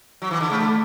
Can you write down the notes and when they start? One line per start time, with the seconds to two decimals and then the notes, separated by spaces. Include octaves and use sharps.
0.22 F#3
0.31 E3
0.40 D3
0.49 C#3 A3
0.60 D3